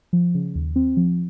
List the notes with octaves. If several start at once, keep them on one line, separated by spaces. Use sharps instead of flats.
F3
C#3
D#2
C4
F3